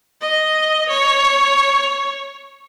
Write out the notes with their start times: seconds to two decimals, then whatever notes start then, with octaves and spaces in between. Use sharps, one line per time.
0.21 D#5
0.89 C#5